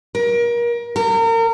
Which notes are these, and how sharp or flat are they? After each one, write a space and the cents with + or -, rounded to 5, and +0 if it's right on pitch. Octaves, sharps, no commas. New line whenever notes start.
A#4 +30
A#4 -35